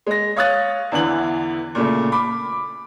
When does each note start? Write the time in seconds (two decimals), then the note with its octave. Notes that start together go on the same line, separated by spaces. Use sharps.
0.07 G#3 A#6
0.36 C#5 F5 D#6 F#6 A6
0.92 E2 D3 E3 F#7
1.75 A#2 C#3 A3
2.12 B5 D6